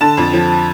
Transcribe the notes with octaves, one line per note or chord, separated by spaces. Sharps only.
D3 A5
F2
F3